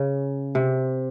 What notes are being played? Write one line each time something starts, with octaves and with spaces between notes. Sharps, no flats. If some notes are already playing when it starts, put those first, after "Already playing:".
Already playing: C#3
C3